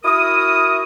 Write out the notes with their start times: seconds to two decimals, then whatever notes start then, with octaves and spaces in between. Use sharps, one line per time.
0.03 E4 F#4 A#4 D#6